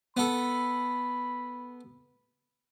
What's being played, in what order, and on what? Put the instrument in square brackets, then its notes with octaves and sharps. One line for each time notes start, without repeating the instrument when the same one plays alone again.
[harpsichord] B3 A4 [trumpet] B5